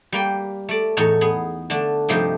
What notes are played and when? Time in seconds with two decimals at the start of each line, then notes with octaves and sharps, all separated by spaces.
0.12 G3 A#3 G5
0.69 A3 D5
0.97 E2 A2 D#4 A4 C#5
1.21 B3 G#4
1.70 D3 A3 D4
2.09 G2 C3 F3 A3 D#4 G4